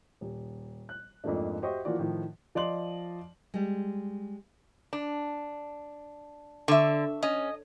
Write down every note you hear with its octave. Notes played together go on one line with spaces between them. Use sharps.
D#1
F#6
F2 G#2 F3 A3 A#3 D4
F#4 G4 C5 D#5 E5 C#6
E3 F3 A#3 F4 F#4 D5
A2 D#3 F3
F3 D5 D#5 C6 F#7
G3 G#3
D4
D3 E5 C#6
C#4 D#5